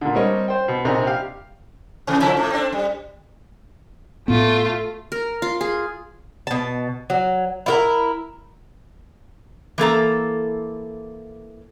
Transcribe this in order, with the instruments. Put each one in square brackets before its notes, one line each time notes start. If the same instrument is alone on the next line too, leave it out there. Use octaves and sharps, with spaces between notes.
[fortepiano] A#2 D3
G3 C4 A#4 C#5 D#5
C5 G5
B2
A#1 C3 D#4 D5 G#5 A#5
G4 F5
[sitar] C3 E3 A3
C#3 F3 E4
A2 A3
C4 D4
G3
[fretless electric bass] A2 B3 [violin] A3 F4
[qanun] A#4
F4
G#4
[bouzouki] B2 A5
F#3
E4 F4 A#4
[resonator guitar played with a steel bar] E3 A#3 A4 A#5